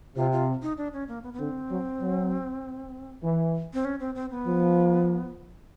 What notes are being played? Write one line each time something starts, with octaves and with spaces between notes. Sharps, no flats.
C3 F4
F4
D#4
D4
C#4
A#3
B3
B3
D3 C4
F#3
F#3
E3
C4
C#4
C4
C4
B3
F3